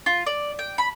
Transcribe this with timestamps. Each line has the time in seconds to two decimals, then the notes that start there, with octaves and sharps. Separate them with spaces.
0.06 F4
0.26 D5
0.59 G5
0.78 B5